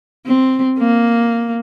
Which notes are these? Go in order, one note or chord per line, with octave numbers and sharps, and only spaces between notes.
C4
A#3